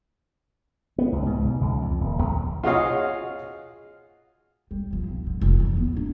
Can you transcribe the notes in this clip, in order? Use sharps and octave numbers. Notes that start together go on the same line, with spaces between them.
B3
C#2
G#2
B1
C#2
F2
D#1
A#1
F4 F#4 G#4 C#5 D#5 F5
G3
F3
B1
D3
F1
E3
B3
D4